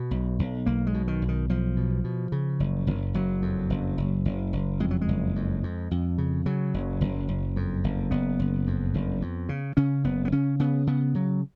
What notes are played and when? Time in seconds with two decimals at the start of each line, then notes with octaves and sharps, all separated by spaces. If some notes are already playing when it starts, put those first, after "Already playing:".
Already playing: B2 B3
0.11 B1
0.39 B1
0.66 B1 A#3
0.87 G#3
0.94 B2
1.08 D#3
1.22 B1
1.28 D#3
1.49 B1 F3
1.77 B2
2.04 B2
2.32 C#3
2.60 F#1
2.87 F#1
3.14 F#1 F#3
3.42 F2
3.70 F#1
3.98 F#1
4.25 F#1
4.53 F#1
4.80 F2 G#3
4.91 F#3
5.01 G#3
5.08 F#1
5.36 F2
5.63 F2
5.91 F2
6.18 C#3
6.46 C#3 F#3
6.74 F#1
7.01 F#1
7.29 F#1
7.56 F2
7.84 F#1
8.11 F#1 B3
8.39 F#1
8.67 F2
8.94 F#1
9.22 F2
9.49 C#3
9.77 C#3 C#4
10.04 F#1 B3
10.25 B3
10.32 C#3 C#4
10.59 C#3 B3
10.87 C#3 B3
11.15 C#3 F#3